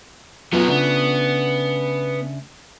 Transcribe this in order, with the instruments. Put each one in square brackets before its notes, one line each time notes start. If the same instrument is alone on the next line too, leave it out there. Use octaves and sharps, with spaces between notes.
[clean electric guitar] F#2 [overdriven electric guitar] F#3 B3 [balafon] F4
[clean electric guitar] C#3 A3 D4 [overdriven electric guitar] B3